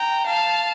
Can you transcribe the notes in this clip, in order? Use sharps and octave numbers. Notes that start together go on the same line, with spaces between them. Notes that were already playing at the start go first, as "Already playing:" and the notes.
Already playing: G5 A#5
F5 A5